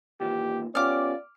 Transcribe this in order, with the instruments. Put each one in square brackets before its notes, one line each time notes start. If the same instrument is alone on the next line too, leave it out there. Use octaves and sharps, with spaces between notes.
[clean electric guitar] D#2 A#2 E3 [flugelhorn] G4
[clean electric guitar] B3 F4 G4 [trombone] C#4 [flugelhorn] D5 [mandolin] D6 F6